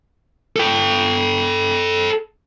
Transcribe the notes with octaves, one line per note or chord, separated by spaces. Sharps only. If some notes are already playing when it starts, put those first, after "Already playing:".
A4 G5